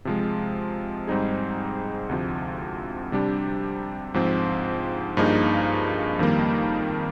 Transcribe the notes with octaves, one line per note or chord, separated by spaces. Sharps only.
C3 F3 G#3
G#2 G3 C4 D#4 G#4
D2 C3 F3
C3 G3 D4 G4
G#2 F3 C4
G2 F3 A#3 D#4 G#4
F2 D#3 G3 A#3